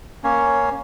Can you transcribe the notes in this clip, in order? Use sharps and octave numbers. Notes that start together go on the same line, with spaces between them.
A#3 C#4 C#5